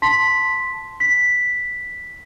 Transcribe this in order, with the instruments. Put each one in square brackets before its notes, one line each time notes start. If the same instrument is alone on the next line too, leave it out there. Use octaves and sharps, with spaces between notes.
[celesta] A5 C6 B6
B6